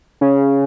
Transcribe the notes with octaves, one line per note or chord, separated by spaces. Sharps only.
C#3